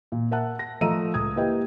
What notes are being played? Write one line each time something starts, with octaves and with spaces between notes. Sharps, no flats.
A#2
A#4 E5 F#5 A5 F#6
A#6
F3 A3 D#5 A#5 E6 D#7
C#2 D#6 G#6
A#3 E4 G4 B4 D#5 G5